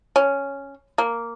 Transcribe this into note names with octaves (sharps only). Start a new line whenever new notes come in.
C#4
A#3